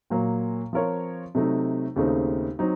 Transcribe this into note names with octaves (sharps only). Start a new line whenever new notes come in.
A#2 F#3 A#3
F3 C4 F4 A#4 C#5
C3 F#3 A3 D#4
D#2 C#3 A3 C4 D#4
F#3 C4 D#4